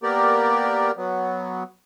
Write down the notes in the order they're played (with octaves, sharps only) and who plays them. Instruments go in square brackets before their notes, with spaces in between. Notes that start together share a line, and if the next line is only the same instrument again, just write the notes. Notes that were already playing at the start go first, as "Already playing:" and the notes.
[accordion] A#3 B3 G4 A#4 D5
F#3 B3